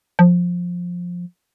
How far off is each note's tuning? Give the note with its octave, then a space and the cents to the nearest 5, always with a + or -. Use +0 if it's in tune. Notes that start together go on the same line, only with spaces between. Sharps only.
F3 +15